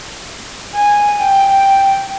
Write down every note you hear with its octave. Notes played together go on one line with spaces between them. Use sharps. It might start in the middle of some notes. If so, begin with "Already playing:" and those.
G#5
G5